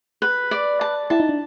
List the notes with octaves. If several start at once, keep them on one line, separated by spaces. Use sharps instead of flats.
B4
D5
A5
E4 A5
D#4
D4